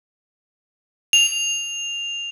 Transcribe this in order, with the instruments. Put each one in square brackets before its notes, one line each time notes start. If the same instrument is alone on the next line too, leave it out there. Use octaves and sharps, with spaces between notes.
[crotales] F7